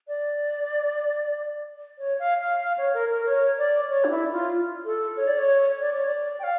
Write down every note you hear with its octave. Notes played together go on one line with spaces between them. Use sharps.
D5
C#5
F5
F5
F5
C#5
A#4
A#4
C#5
D5
C#5
D4
E4
F4
A4
C#5
D5
C#5
D5
C#5
D5
G5
F5